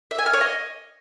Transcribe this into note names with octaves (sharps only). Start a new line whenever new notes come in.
E5
G#5
F6
C#5
D#5